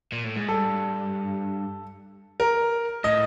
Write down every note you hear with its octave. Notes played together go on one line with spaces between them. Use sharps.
A#2
A2
G#2
G2 A4
A#4
A2 D#5